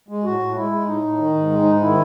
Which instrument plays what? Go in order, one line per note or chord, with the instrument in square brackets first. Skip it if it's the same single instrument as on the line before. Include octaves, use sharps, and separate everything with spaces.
[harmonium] G#3
A2 F#4
A2
G#3 E4
G#3
A2 D#4
A2
D#3
G#2
G#3
G#2
D#3 E4